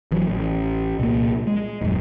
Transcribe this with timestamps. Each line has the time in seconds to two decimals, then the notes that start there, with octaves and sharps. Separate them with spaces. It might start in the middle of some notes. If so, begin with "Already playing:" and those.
0.12 A1 E3 F#3
0.28 A1
0.99 C2 A#2 A#3
1.47 G#3
1.82 D#1 F#2